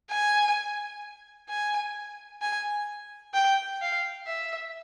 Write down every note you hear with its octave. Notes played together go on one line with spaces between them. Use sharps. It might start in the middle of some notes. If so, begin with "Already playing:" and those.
G#5
G#5
G#5
G5
F5
E5